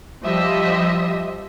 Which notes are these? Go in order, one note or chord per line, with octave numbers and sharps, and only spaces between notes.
F3 G3 G4 C5 D#5 E5